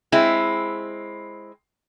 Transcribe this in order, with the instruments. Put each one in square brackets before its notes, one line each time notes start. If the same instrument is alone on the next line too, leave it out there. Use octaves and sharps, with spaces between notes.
[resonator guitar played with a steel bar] G#3 C4 E4